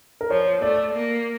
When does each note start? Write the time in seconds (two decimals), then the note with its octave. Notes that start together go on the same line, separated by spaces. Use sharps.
0.21 A#4
0.30 F3 C#5
0.62 A3 D5
0.93 A#3